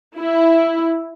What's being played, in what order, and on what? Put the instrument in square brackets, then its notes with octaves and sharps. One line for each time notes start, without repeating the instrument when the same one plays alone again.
[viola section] E4